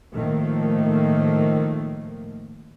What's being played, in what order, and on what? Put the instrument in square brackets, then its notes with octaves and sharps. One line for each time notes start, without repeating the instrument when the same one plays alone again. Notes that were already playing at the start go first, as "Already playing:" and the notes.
[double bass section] A2 D#3 F3 A3 A#3